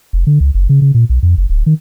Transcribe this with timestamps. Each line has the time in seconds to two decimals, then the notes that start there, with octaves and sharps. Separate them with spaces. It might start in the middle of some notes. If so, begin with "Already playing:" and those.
0.13 F1
0.27 D3
0.40 C#2
0.54 F#1
0.69 C#3
0.82 C#3
0.94 A#2
1.09 B1
1.23 F2
1.38 F#1
1.50 D1
1.66 D#3